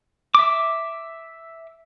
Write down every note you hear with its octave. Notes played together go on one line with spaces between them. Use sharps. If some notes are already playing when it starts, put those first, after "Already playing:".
E5 D6